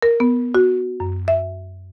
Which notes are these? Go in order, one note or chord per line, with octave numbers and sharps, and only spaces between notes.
A#4
B3
F#4
F#2
E5